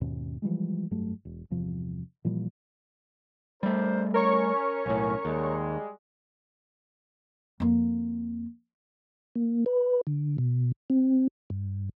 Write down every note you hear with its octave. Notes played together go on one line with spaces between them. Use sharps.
D#2 G#2 B2 C#4
E3 F3 G3 G#3
F1 G2 F#3 A3
E1
G1 E2 C3 F3
A#2 E3 F3 G3
G3 A3 D4 A#4 C5
C#4 A#4 C#5 C#6
B1 A2
D#2 G3 G#3
F2 A#3
A#3
B4
D3
B2
C4
G2